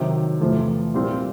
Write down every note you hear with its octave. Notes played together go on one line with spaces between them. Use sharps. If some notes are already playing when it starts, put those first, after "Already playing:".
Already playing: C3 D#3 F#3
E2 C3 F3 A3
A#2 G3 C4 F4